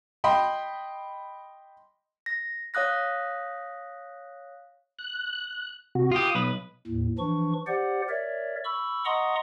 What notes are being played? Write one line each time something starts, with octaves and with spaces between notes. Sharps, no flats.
D#5 G5 B5 C6
A#6
C#5 F5 D#6 F#6 A#6
F#6
C3 F#4
F4 G4 D#6
B1 B4
D#2 A2
E3 F3 D4 C#6
G4 C5 D5 F#5
A#4 C#5 D5 E5
B5 C#6 E6
D#5 F#5 A#5 C6 C#6 D#6